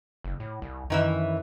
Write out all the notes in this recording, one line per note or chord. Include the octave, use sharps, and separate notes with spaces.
F#1
A2
C2
F#2 D#3 E3 E5